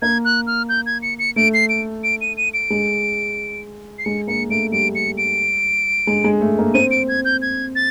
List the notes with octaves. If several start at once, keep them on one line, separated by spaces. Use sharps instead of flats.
A#3 G#6
F#6
F6
G6
G#6
C#7
C#7
A3 D7
C7
D7
D7
D#7
D#7
D7
G#3
C7
G#3 C#7
A#3 C#7
A3 D7
G3 D7
C#7
D7
G#3
G#3
A3
A#3
C4 D#7
D7
G#6
G6
G#6
A6